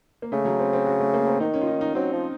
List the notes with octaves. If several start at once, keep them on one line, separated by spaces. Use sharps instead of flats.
A#3
C#3 A3
F#3
C4
C4
F#4
A3
A#3
C4
D#3 D#4
C#4
F4
D#4
D#4
F#3 C4
F3